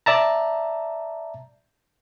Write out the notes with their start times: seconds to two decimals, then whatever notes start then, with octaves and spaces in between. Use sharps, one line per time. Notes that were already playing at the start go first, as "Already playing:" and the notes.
0.06 D5 E5 A5 A#5